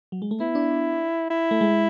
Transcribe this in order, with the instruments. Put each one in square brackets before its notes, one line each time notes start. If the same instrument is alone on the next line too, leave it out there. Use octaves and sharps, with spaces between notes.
[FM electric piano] F#3
G#3
A3
[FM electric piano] B3 [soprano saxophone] E4
[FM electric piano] D4
[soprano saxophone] E4
[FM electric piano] A3
G#3